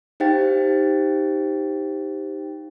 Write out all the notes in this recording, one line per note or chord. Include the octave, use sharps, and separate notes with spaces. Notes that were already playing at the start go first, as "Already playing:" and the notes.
D#4 G4 C5 F5 G5 A6